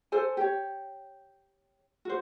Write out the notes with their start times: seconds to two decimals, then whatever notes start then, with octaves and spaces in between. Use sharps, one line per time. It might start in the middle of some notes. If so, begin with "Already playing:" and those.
0.12 A4 C5 G#5
0.37 G4 C#5
2.05 F#4 C5